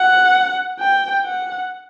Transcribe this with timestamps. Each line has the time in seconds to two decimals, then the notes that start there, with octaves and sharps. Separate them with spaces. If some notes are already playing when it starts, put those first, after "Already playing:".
Already playing: F#5
0.79 G5
1.25 F#5